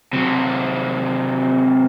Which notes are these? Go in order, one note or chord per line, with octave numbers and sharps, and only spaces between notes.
C3 F#3